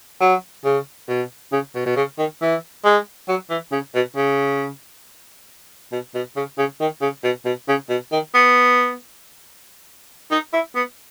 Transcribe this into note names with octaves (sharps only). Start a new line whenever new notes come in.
F#3
C#3
B2
C#3
B2
B2
C#3
D#3
E3
G#3
F#3
E3
C#3
B2
C#3
B2
B2
C#3
C#3
D#3
C#3
B2
B2
C#3
B2
D#3
B3
D#4
E4
B3